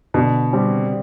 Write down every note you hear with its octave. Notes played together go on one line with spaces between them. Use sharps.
B2 D3
G3 C4